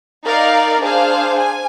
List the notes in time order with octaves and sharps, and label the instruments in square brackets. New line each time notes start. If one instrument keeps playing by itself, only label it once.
[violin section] D#4 A#4 D5 F5
D4 G#4 C5 F5
G#5